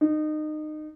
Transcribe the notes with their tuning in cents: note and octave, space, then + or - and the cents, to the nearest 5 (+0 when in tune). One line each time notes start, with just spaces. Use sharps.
D#4 -25